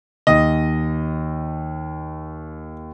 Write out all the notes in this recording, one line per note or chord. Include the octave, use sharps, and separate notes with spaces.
D#2 D#5